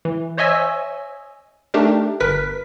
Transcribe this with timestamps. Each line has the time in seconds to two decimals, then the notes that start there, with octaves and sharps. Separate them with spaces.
0.05 E3
0.37 C5 C#5 D#5 E5 G#5 E6
1.74 A3 D4 D#4 G4 A#4
2.20 G1 A#4 B4 B6